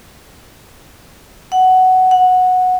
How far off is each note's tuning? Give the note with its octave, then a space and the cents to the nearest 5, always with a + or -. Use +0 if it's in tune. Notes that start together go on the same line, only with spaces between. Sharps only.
F#5 +10
F#5 -10